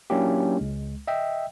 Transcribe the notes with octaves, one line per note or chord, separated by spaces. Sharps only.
F#3 A#3 C#4 D4 E4 G4
C#2 G#3
D#5 E5 G5